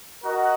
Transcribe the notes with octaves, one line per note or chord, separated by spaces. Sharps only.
F#4 A#4 D#5 F#5